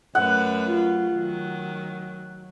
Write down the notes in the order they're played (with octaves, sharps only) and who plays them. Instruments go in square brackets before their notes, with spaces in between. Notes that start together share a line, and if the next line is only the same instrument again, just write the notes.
[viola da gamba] F#2 A3 B4 [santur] F#5
[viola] F#3 F4
[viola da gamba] D#3 [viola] F#3